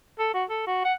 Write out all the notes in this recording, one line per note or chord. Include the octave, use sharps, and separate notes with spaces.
A4
F#4
A4
F#4
F#5